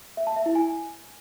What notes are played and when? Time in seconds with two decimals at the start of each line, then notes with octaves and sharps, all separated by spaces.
0.17 E5
0.27 A5
0.36 E5
0.46 E4
0.55 G#5